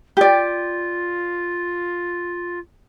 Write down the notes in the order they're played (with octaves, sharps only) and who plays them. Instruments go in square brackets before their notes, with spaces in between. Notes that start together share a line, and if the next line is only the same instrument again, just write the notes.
[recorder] F4 [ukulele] G4 D5